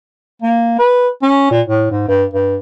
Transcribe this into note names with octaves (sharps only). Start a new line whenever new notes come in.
A#3
B4
C#4
A#2
A2
G#2
G2
G2